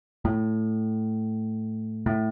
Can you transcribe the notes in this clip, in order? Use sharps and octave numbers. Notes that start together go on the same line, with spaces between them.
A2
A2